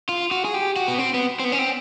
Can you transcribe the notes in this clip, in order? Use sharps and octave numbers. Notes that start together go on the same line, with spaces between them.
F4
F#4
G#4
G4
F#4
B3
C4
B3
C4
B3
C#4
C4